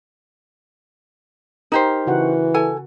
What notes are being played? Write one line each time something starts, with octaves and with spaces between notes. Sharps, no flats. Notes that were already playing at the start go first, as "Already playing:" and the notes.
D#4 G4 A#4 C5
C#3 E3 F#4 F#5
A4 G#5